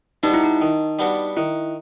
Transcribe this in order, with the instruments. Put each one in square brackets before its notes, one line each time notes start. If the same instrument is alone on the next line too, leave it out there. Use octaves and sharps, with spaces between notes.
[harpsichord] G3 B3 D4 F#4 [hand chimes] D#4
[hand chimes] E4
D#4
[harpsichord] D#3
G3 B3 D4 F#4
[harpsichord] D#3 [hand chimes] E4